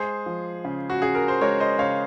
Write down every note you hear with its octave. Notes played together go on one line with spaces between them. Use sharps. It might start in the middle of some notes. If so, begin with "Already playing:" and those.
Already playing: G#3 G#4 C5
F3
C#3
F#4
C#3 G#4
A#4
C5
G#3 A#4 C#5
C5 D#5
C#3 C#5 F5